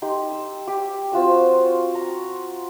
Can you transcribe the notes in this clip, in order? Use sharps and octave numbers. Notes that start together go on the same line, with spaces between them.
D#4 G4 C6
E6
G4
C4 F4 F#4 E6
A#5 C#6